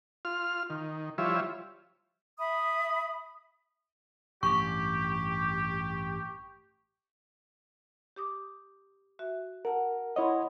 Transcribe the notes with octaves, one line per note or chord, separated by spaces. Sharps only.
F4 F6
D#3
F3 G3 E4 F4 C#5 E5
E5 B5 D#6
A1 G2 G4 C#6
G4 D6 D#6
F#4 E5
A#4 F#5 A5
E4 C#5 D#5 F#5 B5 C6